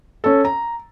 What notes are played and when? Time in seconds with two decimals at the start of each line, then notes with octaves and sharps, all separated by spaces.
0.24 C#4 A4
0.45 A#5